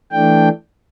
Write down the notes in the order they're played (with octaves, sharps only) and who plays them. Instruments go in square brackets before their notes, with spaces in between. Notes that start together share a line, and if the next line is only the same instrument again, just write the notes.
[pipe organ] E3 A3 D4 G5